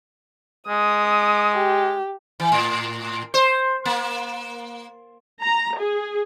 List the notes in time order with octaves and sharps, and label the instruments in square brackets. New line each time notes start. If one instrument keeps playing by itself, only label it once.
[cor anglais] G#3 [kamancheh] D#6
[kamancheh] G4
[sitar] E3
A2
C5
A#3
[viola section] A#5
G#4